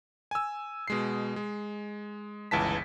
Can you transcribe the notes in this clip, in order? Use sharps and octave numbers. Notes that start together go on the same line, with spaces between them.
G#5 E6
B2 G#3 C7
G#3
G1 C#2 E3 A5 B6